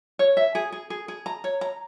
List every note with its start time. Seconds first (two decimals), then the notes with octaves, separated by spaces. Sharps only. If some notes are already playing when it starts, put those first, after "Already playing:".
0.19 C#5
0.37 E5
0.55 G#4
0.72 G#4
0.90 G#4
1.08 G#4
1.26 A#5
1.44 C#5
1.61 A#5